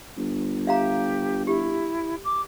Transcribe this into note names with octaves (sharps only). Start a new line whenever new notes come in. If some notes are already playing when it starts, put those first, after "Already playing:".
G1
G4 E5 F5 A#5
E4 G4
D6